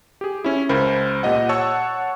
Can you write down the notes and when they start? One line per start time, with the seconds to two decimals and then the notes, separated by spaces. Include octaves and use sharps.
0.21 G4 G#4
0.44 C#4 E4
0.69 C#2 A#4 C5 B5
1.23 A#2 G4 D#5 F#5
1.49 C#5 F#5 A5 C#6 E6